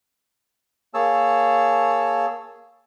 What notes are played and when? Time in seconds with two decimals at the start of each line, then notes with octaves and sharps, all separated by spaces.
0.94 A#3 G#4 C#5 A5 E6